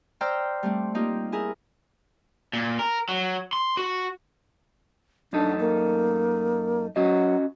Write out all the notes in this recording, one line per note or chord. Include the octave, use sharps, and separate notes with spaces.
C5 D5 G5 A#5 E6 F6
G3 A3 C4
A#3 C4 D#4 F4 G4
E4 G#4 A#4
A#2
A#4
F#3
C6
F#4
F#2 D4 D#4 A4
A#3
F#3 C#4 F#4 D#5